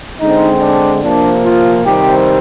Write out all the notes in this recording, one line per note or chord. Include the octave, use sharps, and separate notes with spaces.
D3 G#3 C4 D#4
D4
C3 F3 A#3 D4
F4
C3 D#3 G3 C4 G4